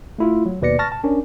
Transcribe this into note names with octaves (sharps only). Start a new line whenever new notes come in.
A3 E4 F4
F#3
D#2 B2 B4 D5 A#6 C#7
A5 C#6 F6 A6 A#6
A5
C#4 D4 A#4